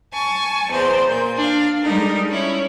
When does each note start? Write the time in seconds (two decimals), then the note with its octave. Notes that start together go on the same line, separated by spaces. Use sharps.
0.13 G#5 A5 C#6
0.69 E2 C5 D5
1.08 A#2 G6
1.37 D4 F5
1.81 G3 G#3 D#4 A4 A#4
2.30 C#4 E4 C#5